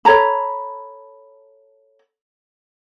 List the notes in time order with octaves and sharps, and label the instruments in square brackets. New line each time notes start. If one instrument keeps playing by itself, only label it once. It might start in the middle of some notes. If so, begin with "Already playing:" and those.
[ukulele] A4 C#5 A#5 B5